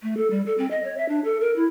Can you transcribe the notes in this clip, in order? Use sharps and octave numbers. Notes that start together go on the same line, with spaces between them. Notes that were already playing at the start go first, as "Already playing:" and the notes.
A3
A4
G3
A4
C4
D#5
C#5
E5
D4
A4
A#4
E4